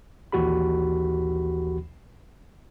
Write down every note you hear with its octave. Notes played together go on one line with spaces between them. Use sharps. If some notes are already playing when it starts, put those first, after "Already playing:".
A#1 D#2 E3 F#4 G4 B5